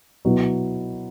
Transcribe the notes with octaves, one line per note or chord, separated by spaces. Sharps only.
B2 F#3 B3 E4